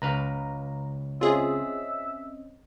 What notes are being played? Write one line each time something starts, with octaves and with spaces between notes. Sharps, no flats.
C#2 B4 F5 A#5
C4 C#4 F4 G#4 D#5 E5